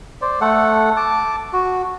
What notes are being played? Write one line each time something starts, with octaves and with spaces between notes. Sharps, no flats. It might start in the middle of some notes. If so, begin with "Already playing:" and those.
C5 D5
A3 A4 F#5
A5 D6
F#4